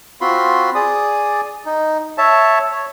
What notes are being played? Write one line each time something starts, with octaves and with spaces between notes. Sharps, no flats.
C4 F4 F#4 B5 C6
G#4 D5 D#6
D#4
C#5 E5 A5
C#5